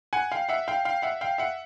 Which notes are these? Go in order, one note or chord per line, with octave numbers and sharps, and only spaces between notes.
F#5 G#5
F5 G5
E5 F#5
F5 G5
F5 G5
E5 F#5
F5 G5
E5 F#5